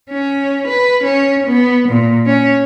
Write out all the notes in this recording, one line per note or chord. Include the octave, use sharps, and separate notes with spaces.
C#4
B4
C#4
B3
A#2
C#4